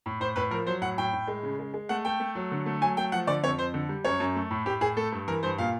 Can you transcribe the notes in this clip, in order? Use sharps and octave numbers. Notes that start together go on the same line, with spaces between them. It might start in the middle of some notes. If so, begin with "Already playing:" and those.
A2
A2 C5
A2 B4
F3 A#4
F#3 C5
A2 F#5
A2 G5
A2
G#3
C#3
G#3
G#3
A3 F#5
A3 G5
A3
F#3
D3
A3
F#3 G#5
A3 G5
F3 F#5
D3 D5
F2 C#5
F2 C5
D3
G3
F#2 C#5
F#2
A3
A2
A2 G4
A2 G#4
A3 A4
G2
E3 A#4
G2 C5
A#2 F5